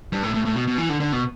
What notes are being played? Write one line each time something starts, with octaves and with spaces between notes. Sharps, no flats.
G2
A2
A2
A2
B2
B2
E3
D3
D3
B2